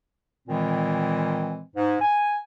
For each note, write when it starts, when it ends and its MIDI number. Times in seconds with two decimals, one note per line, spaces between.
0.48 1.62 46
0.48 1.62 51
0.48 1.62 52
0.48 1.62 56
0.48 1.62 60
1.76 1.97 44
2.02 2.39 80